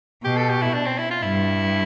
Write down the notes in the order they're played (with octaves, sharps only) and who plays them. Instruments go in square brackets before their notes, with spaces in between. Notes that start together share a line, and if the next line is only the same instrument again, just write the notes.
[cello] B2 [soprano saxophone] G4
[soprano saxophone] A4
G4
E4
D4
C4
E4
F4
[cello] G2 [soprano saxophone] E4